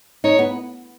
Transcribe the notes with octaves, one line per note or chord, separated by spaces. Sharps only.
D#4 C#5
B3